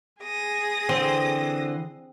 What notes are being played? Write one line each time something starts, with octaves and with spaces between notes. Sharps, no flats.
G#4 D#6 A#6
D3 E3 C4 C6